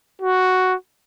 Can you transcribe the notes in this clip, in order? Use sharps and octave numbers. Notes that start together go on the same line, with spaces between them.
F#4